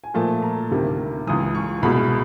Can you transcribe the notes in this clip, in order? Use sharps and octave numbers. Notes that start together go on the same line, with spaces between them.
G#5
A#2 F3 A3 A5
A#5
D2 C3 D#3 G3 A#3
C#2 C#3 E3 D#6
C#6
C2 B2 G#3 B3 B5